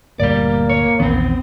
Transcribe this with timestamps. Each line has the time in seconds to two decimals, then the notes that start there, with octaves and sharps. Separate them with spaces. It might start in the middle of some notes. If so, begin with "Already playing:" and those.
0.20 G1 D2 A#2 G3 A#3 D5
0.70 C#5
1.00 A#1 E2 D#3 B3 C4